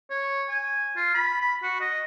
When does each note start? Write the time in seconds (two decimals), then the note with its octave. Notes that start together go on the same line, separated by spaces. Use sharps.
0.10 C#5
0.49 G#5
0.97 F4
1.14 B5
1.41 B5
1.63 F#4
1.81 D#5